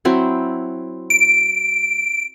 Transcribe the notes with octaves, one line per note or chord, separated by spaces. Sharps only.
F#3 C4 E4
D7